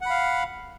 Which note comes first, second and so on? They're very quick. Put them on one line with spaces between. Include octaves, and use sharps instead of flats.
F#5 B5 F5